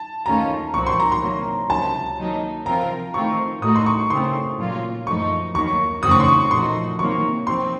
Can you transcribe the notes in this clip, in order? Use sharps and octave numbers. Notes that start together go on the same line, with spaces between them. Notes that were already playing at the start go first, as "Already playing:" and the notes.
Already playing: A5
D#2 D#3 A3 C#4 F4 A#5
C2 A#2 F3 C4 F#4 C#6
C6
A#5
C6
C3 F#3 A#3
C#2 C3 F#3 A5
D#3 F#3 A#3 D#4
C3 F3 C4 F4 A#4 A#5
D#3 A3 C4 F4 C#6
A2 A3 D#4 F#4 D#6
C6
C#6
C#3 A3 C4 C6
A#2 F#3 A#3 F4
F#2 F3 A3 D#4 C#6
D#2 D#3 F#3 A#3 C#6
F2 C#3 A3 C4 F#4 D#6
C#6
C6
C#6
A#2 F3 A3 D#4 F#4 C6
C3 D#3 F#3 A#3 C#6
F3 C4 C6